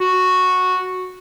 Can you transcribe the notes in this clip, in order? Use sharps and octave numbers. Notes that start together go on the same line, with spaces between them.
F#4